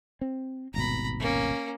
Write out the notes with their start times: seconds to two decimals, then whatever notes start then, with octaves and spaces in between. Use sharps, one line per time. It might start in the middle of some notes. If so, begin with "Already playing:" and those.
0.21 C4
0.74 D#1 G#1 B2 A#5 B5
1.20 A#3 C#4